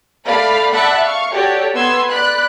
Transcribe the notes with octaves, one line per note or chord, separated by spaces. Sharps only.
A3 D5 F5 B5
D5 E5 F#5 A5 B5 F#6
F5 C#6
F#4 G4 A4 C#5 D5
B3 B4 C6 E6 G#6
D5 B5 F#6